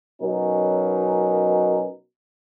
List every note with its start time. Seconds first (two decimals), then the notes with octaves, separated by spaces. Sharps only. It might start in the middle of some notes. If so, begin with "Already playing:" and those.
0.21 B2 F#3 C#4 D#4 A#4